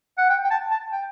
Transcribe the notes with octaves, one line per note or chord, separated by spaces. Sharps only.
F#5
G5
G5
A5
A5
G5